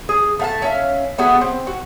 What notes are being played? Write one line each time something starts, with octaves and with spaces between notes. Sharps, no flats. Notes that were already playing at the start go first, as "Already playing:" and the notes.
G#4
A3 F5 A5
C#4 E5 F5
A3 B3 F#4 G#4
C4
F#4